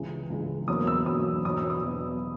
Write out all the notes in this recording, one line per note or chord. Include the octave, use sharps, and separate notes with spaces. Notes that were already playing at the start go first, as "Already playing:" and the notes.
Already playing: C#2 C#3 E3 G#3
C#2 C#3 E3 G#3
E2 B2 F#3 A#3 D#6
E6
E2 B2 F#3 A#3 D#6
E2 B2 F#3 D#6
E6
D#6
E2 B2 F#3